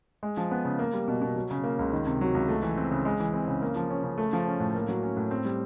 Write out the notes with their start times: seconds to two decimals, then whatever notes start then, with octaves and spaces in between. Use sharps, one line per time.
0.23 G#3
0.37 F3
0.51 B3
0.65 C#3
0.79 A#3
0.93 G3
1.08 B2
1.22 B2
1.36 F#3
1.51 C#3
1.64 A#3
1.79 C#2
1.92 D#3
2.07 C3
2.21 F#3
2.35 C#2
2.49 A3
2.62 E3
2.77 C4
2.91 C#3
3.05 G#3
3.20 E3
3.33 C4
3.48 C#3
3.62 A#3
3.76 F3
3.90 C#4
4.04 C#3
4.18 A3
4.33 F3
4.47 C#4
4.60 A2
4.75 A#3
4.89 F#3
5.03 C#4
5.17 A2
5.31 C4
5.45 G3